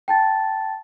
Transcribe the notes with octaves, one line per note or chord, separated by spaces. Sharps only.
G5 A5 A6